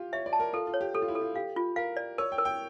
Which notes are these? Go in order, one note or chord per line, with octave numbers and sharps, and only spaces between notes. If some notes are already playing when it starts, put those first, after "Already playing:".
Already playing: F4 G4
C#5 E5
D5
A5
A#4
F4 A4
F4
C#5
G4
G4 A4
F4
E4
A4
F4
G4 F5
F4
A#4 F5
D5
A#4 C#5
G5
A#4
G5